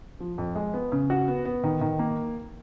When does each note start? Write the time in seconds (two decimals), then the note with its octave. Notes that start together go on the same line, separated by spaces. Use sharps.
0.20 F3
0.38 F2
0.55 G#3
0.74 B3
0.92 C#3
1.10 F#4
1.28 B3
1.45 B3
1.64 D#3
1.81 D#3
1.99 A#3